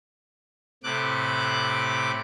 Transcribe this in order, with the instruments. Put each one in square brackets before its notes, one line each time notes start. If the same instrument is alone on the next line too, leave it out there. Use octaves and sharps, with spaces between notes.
[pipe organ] A2 C3 D6 F#6